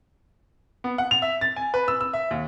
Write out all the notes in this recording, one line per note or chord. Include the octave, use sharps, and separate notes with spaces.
B3
F#5
F7
E5
A6
G#5
B4
E6
E6
E5
D#2